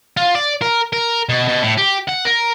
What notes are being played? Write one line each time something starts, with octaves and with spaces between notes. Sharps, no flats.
F4
D5
A#4
A#4
B2
B2
A2
G4
F#5
A#4